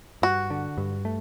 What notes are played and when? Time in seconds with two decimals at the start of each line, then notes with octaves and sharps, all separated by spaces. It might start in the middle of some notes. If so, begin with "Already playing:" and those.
0.22 G2 F#4
0.51 D3
0.77 G2
1.05 A3